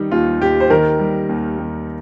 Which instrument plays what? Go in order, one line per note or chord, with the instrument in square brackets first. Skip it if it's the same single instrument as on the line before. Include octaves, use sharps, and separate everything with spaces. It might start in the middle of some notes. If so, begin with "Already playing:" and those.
Already playing: [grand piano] D#3 G3 D#4
D#2 F4
D#2 G4
C5
D#3 A#4
G3
D#2
D#2